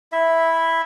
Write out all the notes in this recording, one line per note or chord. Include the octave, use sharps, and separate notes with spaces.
E4 E5